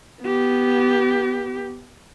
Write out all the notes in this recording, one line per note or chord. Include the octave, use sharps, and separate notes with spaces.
B3 G4